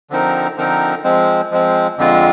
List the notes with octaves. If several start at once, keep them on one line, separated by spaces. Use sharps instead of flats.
D3 F3 C4 D#4 A#4
D3 F3 C4 D#4 A#4
F3 G#3 C4
F3 G#3 C4
F2 D3 G#3 C4 F4